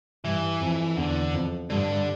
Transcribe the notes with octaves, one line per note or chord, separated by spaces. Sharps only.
G2 E3
F2
E2 D3
F2
G2 D3